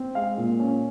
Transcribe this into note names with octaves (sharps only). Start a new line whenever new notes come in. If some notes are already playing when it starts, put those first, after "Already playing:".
Already playing: C4
G#3 F5
A#2
C#4